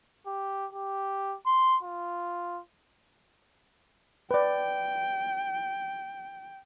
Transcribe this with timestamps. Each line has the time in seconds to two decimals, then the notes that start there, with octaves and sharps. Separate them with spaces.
0.27 G4
0.73 G4
1.46 C6
1.83 F4
4.31 B4 D5 G5